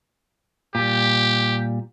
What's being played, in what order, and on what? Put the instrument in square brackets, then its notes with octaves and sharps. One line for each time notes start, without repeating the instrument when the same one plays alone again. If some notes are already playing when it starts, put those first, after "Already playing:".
[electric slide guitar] A#2 G3 [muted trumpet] G4